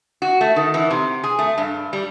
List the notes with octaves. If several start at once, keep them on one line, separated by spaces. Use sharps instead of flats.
F#4
A3
D#3
E3
C3
G#4
A3
G2
G3